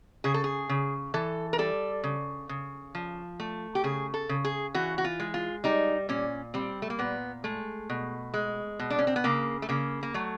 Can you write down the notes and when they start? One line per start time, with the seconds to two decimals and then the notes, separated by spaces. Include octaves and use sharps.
0.24 C#3 G#4
0.34 A4
0.44 G#4
0.69 C#3
1.14 E3 A4
1.53 A#4
1.58 G3 A4
2.04 C#3
2.49 C#3
2.95 F3
3.40 A3
3.75 G4
3.84 C#3 G#4
4.14 A4
4.29 C#3
4.45 G#4
4.74 E3 F#4
4.98 F#4
5.05 F4
5.20 G#3
5.34 F4
5.64 G3 D#4
6.09 A#2 C#4
6.54 G3 C4
6.82 A3
6.90 A#3
6.99 A#2 B3
7.44 G#3 A3
7.90 B2
8.34 G#3
8.79 B2
8.90 D4
8.99 C#4
9.07 C4
9.16 B3
9.24 C#3 A#3
9.62 A3
9.69 C#3 A#3
10.03 A#3
10.14 F#3 A3